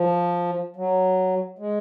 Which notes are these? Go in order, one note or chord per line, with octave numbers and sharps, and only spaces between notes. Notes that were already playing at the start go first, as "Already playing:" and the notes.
Already playing: F3
F#3
G#3